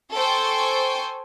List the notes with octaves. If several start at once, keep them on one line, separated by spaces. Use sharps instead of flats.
A4 C5 G5 G#5 C#6